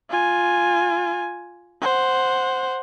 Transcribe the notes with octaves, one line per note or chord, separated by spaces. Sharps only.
F4 G#5
C5 F#5